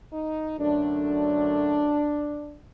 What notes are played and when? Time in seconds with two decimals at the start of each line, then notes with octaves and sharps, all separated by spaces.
0.11 D#4
0.58 F#2 D3 F#3 A3 D4